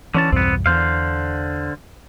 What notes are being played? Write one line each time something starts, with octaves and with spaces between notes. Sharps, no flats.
D3 E3 C#4 A5
B1 E2 G2 B3 C4
E2 D3 C5 F5